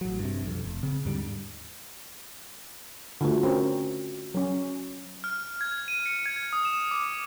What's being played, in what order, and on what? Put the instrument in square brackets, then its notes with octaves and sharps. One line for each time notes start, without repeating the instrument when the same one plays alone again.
[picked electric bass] A1 F#3
G2 C3
B1 F2
F1
C#3 C4
D#2 G#2 D3 G3
[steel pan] D3 A3 [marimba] F4 F#4
[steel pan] C4 C#4 A#4
F#3 C#4
[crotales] F6
G#6
D#7
C#7
G#6
D#6
E7
D6